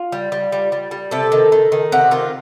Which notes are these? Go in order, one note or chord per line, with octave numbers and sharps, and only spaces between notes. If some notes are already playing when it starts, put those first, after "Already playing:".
Already playing: F4
G3
G3
G3
G3
G3
C3 A4
D#3
D#3
D#3
C3 F#4
D#3 F4